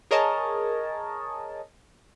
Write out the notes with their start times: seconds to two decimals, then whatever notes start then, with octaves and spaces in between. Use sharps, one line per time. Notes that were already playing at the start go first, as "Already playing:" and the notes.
0.11 G#4 A#4 C#5 D#5 A5